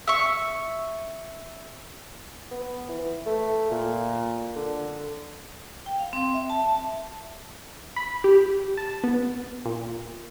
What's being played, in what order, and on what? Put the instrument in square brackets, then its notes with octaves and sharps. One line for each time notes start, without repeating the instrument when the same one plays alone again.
[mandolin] E5 C#6
[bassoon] B3
E3
A3
A#2
D3
[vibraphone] G5
F5
C4
E5
A5
E5
[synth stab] B5
G4
A5
B3
A#2